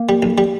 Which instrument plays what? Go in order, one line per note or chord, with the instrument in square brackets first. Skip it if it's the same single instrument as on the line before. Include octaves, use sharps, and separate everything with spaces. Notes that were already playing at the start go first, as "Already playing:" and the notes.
Already playing: [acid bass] A#3
[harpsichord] G3
B1
G3